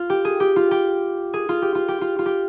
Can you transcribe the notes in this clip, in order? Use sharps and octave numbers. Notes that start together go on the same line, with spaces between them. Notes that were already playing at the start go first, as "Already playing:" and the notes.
Already playing: F4
G4
G#4
G4
F4
G4
G#4
F4
G4
F4
G4
F4
F4
G4